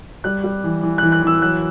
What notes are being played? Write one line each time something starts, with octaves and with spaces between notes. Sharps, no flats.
G3 F#6
G3
E3
E3
E3 F#6
F#6
E3 E6
F#3 F#6